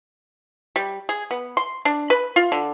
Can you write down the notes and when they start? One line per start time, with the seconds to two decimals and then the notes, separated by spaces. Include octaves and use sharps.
0.76 G3
1.09 G#4
1.31 B3
1.57 C6
1.85 D4
2.10 B4
2.36 F4
2.52 D3